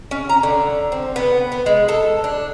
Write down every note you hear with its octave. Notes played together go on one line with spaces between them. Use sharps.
C#4
A#5
D3
C4
B3
B3
G#3
A4
D4